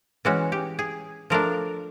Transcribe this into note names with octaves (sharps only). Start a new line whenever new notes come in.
E3 G#3 C#4 F#4
G4
G#4
F3 A3 D4 A#4